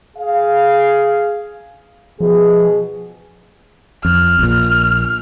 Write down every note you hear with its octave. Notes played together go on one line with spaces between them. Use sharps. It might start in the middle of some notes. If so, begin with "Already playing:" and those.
G#4 F5
B2 F3 G#4
F2 F6
A#1 A#2